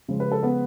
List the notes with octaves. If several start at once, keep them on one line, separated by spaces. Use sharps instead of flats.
C#3 F3 G#3
B4
A4
B3 B4